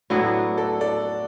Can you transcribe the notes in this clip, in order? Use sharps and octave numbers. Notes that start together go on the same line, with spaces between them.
A2 F#3 B3 D4 E4 F#4
A4 D5
A4 D5